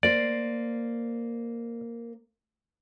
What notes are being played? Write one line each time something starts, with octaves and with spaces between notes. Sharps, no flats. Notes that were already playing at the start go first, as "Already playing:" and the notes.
A#3 C5 D5